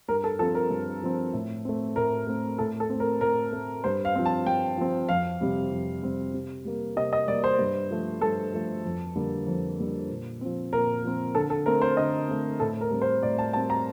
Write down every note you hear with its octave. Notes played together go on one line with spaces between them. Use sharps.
G2 A#4
A4
F3 C4 A4
A#4
G2
F3 C4
A2
A3 C4
A2 A#4
A3 C4
A2 A4
A4
A3 C4
A#4
A2 A#4
A3 C4
G2 C5
F5
F3 C4
A5
G2 G5
F3 C4
F2 F5
C3 G3 C4
F2
C3 G3 C4
C3
G3 A#3
C3 D#5
D#5
G3 A#3 D5
C5
G2
F3 A3
G2 A4
F3 A3
F2
D3 G3 A#3
F2
D3 G3 A#3
A#2
F3 C4
A#2 A#4
F3 C4
D3 A4
A4
A3 C4 A#4
C5
D3 D#5
A3 C4
A2 A4
A#4
G3 C4
C5
A2 D5
A5
G3 C4 A5
A#5